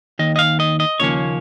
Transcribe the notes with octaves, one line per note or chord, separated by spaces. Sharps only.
D#2 D#3 D#5
D#5
F5
D#5
D#5
D#2 C#3 F3 A#3 C#4 C#5